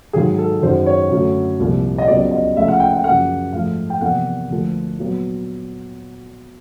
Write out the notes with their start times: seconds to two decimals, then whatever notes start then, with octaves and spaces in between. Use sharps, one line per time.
0.13 G#2 D#3 F#3 G#4
0.38 A4
0.62 F#2 D#3 G#3 C5
0.86 C#5
1.10 F#2 D3 F#3 A3
1.60 C2 A#2 F3 A#3
1.98 D#5
2.07 C#2 C#3 F#3 B3 D5
2.31 D#5
2.56 C#2 C#3 F3 A3 E5
2.68 F#5
2.80 G5
2.93 G5
3.04 F#2 C#3 F3 A#3 F#5
3.53 G#2 F3 A3 F5
3.90 G5
4.01 E2 C3 F3 A#3 F#5
4.50 D2 D3 F3 A#3
4.98 A#2 F#3 B3